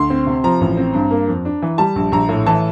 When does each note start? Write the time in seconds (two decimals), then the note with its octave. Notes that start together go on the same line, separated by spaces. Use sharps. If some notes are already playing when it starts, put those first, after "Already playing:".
Already playing: D2 C6
0.10 C4
0.27 C3
0.44 F3 A#5
0.61 A1
0.77 C4
0.94 G2
1.11 A#3
1.28 F2
1.45 D4
1.62 E3
1.78 G3 A5
1.96 A#1
2.12 A#1 A#5
2.29 A2
2.46 E3 A5